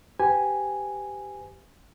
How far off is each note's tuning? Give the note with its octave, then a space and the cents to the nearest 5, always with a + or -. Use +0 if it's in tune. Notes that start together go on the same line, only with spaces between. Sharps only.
G4 +0 B4 +45 G#5 +0